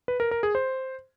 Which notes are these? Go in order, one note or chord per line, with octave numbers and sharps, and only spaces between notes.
B4
A#4
A#4
G#4
C5